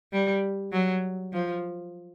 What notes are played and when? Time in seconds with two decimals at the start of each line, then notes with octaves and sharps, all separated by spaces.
0.13 G3
0.73 F#3
1.33 F3